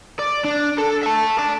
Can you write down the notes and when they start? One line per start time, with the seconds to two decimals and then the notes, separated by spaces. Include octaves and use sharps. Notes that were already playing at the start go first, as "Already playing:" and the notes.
0.19 D5
0.44 D4
0.78 A4
1.03 E5 A5
1.38 D5 A5